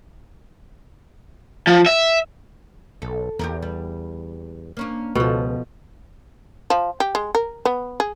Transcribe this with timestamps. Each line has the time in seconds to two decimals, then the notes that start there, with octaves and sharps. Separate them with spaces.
1.67 F3
1.86 E5
3.02 B1 A4
3.39 E2 G4 G#4 A#4
3.62 G3
4.77 A#3 C#4 D4
5.15 C#2 B2 F3 A4
6.70 F3
7.00 G4
7.15 G#3
7.35 A#4
7.65 B3
8.00 G#4